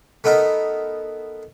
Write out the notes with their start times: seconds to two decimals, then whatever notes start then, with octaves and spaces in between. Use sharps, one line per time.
0.24 A3 B3 D#4 A#4